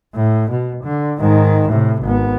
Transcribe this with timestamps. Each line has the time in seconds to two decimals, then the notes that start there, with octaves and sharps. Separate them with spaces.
0.15 A2
0.51 B2
0.84 D3
1.20 G#2 D#3
1.69 A2 C3
2.03 G#1 B3